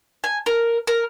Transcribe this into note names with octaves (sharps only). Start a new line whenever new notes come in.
G#5
A#4
A#4